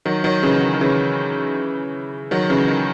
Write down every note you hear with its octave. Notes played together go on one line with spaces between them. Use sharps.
D#3 F#3
D#3 F#3
C#3 E3
D#3
D#3
C#3 E3
D#3 F#3
C#3 E3
D#3